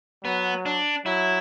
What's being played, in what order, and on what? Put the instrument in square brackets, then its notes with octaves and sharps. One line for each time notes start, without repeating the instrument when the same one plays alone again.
[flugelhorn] F#3 [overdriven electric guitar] B3
[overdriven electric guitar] D4
[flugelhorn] F#3 [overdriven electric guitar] E4